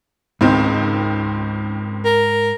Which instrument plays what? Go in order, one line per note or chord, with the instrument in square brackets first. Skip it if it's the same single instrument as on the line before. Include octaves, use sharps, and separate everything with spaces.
[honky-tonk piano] C#2 D#3 C4 [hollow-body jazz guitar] G#2
[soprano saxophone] A#4